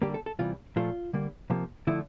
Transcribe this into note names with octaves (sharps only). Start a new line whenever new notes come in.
D3 G3 A#3 G4
A4
A4
C3 E3 G3 F4
A#2 F3 A3 F4
D3 G3 A#3
C3 F3 A#3
D3 F3 A3 E4